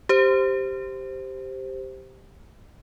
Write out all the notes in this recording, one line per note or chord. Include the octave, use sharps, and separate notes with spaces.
G4 C5